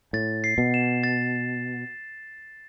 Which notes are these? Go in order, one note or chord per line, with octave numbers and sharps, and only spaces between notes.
A2 A6
C7
B2
E7
A6